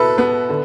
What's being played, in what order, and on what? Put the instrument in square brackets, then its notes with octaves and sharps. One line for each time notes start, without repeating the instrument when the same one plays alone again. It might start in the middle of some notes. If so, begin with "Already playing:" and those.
Already playing: [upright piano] B2 E4 [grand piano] A4 B4
[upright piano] B3 [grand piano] B4
[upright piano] D3